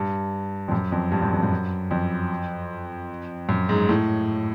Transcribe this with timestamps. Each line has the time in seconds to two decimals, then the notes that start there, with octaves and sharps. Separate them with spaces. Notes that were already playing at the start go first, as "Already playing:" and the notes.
Already playing: G2
0.68 F2
0.72 F#2
0.92 F2
1.12 G2
1.22 F#2
1.33 F2
1.43 F#2
1.91 F2
3.49 F#2
3.69 G#2
3.89 A2